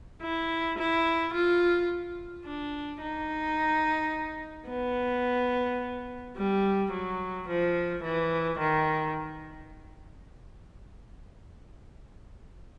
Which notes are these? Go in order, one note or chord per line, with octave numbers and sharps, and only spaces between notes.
E4
E4
F4
D4
D#4
B3
G3
F#3
F3
E3
D#3